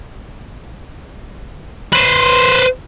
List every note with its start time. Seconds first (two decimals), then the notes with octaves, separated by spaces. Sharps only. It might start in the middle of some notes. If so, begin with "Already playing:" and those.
1.92 B4 C5